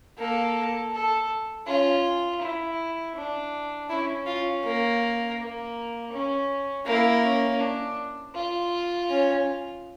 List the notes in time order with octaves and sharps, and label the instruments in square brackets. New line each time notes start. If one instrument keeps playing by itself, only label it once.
[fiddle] A#3 [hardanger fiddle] A4
[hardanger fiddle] A4
[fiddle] C#4 [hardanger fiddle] F4
[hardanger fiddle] E4
D4
[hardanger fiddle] C#4 [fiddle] E4
[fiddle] F4
A#3
[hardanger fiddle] A#3
C#4
[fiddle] A#3 [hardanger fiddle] E4
[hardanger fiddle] C#4
D4
F4
[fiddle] C#4